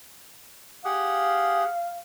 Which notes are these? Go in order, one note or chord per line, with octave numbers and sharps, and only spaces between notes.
G4 G#4 F5 F#5